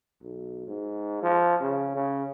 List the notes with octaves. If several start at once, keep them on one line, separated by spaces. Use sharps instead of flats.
B1
G#2
F3
C#3
C#3